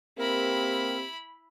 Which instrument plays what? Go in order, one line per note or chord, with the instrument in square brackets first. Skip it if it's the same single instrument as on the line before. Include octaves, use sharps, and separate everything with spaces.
[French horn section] A#3 C4 G4 [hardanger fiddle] E4 B5 [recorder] A#4